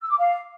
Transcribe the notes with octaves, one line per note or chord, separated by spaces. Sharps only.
E6
D6
F5